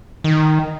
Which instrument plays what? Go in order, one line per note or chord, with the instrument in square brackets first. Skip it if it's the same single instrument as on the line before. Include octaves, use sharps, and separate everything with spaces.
[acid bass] D#3